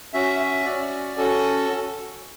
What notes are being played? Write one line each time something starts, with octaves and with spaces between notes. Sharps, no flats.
C#4 F#4 E5
E5
C#4 F#4 D5
C#4 F#4 A4